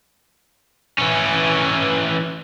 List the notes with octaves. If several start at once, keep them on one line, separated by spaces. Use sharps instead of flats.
E3 C#4